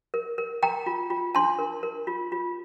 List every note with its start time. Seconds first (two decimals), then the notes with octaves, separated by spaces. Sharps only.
0.14 A#4
0.38 A#4
0.63 A#4 G5 A#5
0.86 F4
1.10 F4
1.35 D4 A5 C6
1.59 A#4
1.83 A#4
2.07 F4
2.32 F4